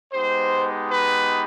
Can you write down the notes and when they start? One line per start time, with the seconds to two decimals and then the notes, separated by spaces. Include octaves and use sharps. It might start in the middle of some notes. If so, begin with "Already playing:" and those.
0.13 G#3 B3 D#4 G4 C5
0.91 B4